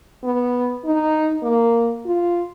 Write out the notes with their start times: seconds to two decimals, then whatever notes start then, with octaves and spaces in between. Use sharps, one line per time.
0.24 B3
0.85 D#4
1.43 A#3
2.06 F4